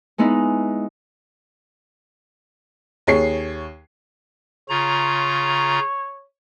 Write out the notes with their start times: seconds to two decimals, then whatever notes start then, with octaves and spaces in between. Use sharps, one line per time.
0.18 G#3 B3 D#4 E4
3.07 D#2 G#4 C#5 C7
4.69 C#3 F4 C#5 A#5